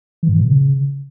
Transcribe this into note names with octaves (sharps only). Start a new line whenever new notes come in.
E3
G#2
E3
A#2
C#3